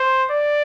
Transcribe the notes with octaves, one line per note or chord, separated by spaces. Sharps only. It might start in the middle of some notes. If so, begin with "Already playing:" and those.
Already playing: C5
D5